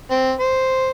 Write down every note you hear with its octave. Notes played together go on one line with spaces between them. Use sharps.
C4
C5